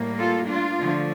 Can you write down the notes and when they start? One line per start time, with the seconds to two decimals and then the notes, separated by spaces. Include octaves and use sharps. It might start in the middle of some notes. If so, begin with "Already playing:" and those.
Already playing: A2 G3 A#3
0.19 F4 A4
0.48 D4 F4
0.78 D3 F3 A3